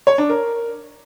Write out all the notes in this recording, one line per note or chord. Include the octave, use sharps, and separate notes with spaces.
C#5
D4
A#4